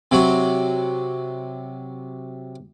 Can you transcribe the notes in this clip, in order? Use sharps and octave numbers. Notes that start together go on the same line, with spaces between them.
C3 F#3 F#4